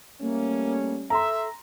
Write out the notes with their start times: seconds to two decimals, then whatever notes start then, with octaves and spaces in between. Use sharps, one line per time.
0.21 G3 A3 A#3 C#4
1.10 A4 E5 A#5 C6